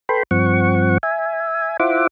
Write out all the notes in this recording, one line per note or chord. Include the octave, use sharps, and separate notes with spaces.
A4 B4 G5 B5 C6
G2 F3 C4 F#5 C#6
E5 G#5
E4 F4 C5 E5 F#5 D6